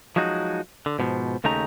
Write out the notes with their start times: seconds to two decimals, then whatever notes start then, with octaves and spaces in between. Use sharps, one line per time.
0.16 F3 F#3 G#3 D#4 F#4
0.86 D3
0.99 G#2 B2 F3
1.44 D#2 C#3 A3 D#4 G4 A#5